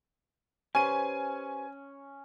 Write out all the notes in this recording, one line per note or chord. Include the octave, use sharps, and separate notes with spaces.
C#4 G4 B4 C5 G#5 D#7